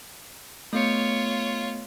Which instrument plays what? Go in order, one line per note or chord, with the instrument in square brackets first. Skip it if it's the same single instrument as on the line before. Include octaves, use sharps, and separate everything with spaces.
[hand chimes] A3 B3 C#7 [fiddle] F4 C#5